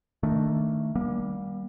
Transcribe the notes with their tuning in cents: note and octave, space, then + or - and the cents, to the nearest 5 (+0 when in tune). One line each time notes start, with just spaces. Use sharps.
D#3 +0 A3 +15 D4 +0
G3 +0 A#3 +35